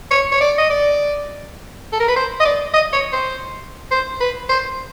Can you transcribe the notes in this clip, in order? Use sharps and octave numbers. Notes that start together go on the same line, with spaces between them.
C#5
C#5
D5
D#5
D5
A4
A#4
B4
C5
D#5
D5
D#5
C#5
C5
C5
B4
C5